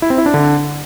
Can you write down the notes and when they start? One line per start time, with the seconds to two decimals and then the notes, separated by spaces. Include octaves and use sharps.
0.02 E4
0.10 C4
0.18 E4
0.26 D4
0.34 D3